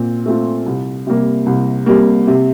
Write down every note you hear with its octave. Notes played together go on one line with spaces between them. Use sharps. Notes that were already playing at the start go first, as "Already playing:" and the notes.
Already playing: A#2 C4
A3 C4 F4
C2
C3 G3 A#3
C2
C3 G3 A#3
C3